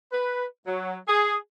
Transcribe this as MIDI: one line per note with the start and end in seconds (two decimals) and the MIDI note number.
0.12 0.46 71
0.67 0.97 54
1.08 1.35 68